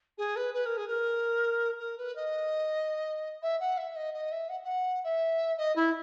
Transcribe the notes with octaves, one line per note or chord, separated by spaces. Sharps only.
G#4
B4
B4
A#4
G#4
A#4
A#4
B4
D#5
E5
F#5
E5
D#5
D#5
E5
F#5
F#5
E5
D#5
E4